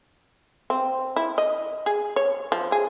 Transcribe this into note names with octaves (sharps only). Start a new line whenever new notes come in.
C4
E4
D#5
G#4
C#5
F3
G#4